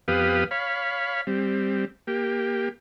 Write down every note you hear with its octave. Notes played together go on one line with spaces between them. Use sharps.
F2 B3 G4 B4 F5 D#6
C#5 F5 B5
G3 C4
A#3 G4